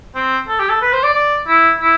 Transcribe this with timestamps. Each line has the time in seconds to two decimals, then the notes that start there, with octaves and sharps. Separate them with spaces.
0.15 C4
0.48 A4
0.60 G4
0.70 A4
0.82 B4
0.93 C5
1.04 D5
1.14 D5
1.48 E4
1.81 E4